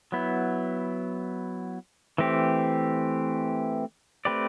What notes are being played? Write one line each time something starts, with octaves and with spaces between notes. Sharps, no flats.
F#3 B3 E4
E3 A3 C4 G4
A3 C4 G4 B4 D5